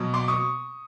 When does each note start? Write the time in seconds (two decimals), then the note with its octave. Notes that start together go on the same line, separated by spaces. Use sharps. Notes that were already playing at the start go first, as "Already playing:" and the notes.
Already playing: B2 F#3
0.14 C6 D6
0.28 C#6 D#6